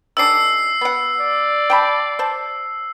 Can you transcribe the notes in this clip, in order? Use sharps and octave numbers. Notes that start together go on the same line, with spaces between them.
D#3 G#3 D4 E6 C7
B3 F#5
D5
G5 A5 B5
C5 A5